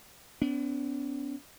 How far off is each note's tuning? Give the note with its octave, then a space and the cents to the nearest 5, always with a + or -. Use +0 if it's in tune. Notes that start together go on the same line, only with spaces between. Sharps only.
B3 +35 D4 -40